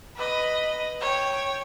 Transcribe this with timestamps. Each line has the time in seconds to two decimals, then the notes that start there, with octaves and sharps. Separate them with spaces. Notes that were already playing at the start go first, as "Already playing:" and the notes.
0.16 B4 D#5
1.01 C#5 G5